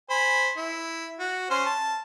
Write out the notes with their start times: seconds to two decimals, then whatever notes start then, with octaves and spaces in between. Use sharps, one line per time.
0.10 C5 G#5 B5
0.57 E4
1.19 F#4
1.50 C#4 C5 C6
1.66 A5